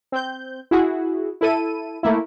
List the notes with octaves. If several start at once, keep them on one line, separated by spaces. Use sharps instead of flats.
C4 G6
E4 F#4 G#4
E4 A4 D#7
A3 A#3 E4